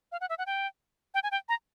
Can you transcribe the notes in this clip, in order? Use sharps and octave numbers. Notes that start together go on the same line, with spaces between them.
F5
F#5
E5
F#5
G5
G5
G#5
G5
A#5